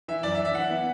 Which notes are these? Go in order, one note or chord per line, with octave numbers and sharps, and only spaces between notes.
E3 E5
F#2 D5
E5
D4
E5
E3 F#5
B3